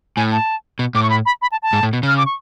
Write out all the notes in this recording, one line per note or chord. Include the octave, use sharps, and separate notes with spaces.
A2 G#5
A5
B2
A2 D6
C#6
B5
B5
B5
A5
A5
G#2
A2
B2
C#3 F6
D6
C#6